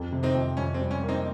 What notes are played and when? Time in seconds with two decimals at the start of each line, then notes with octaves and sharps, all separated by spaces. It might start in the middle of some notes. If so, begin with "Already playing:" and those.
Already playing: F2
0.12 C3
0.23 C4 D#4
0.35 F2
0.57 F2 C#4
0.74 C4
0.80 G3
0.91 C#4
1.02 A#3
1.08 C4 D#4